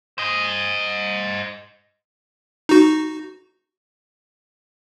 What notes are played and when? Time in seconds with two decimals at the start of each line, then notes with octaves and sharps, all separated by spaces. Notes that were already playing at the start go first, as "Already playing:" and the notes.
0.18 C5 D#5
2.69 D#4 F#4